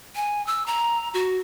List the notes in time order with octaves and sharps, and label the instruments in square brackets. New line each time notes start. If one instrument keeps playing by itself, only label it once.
[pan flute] G#5
E6
A#5
F#4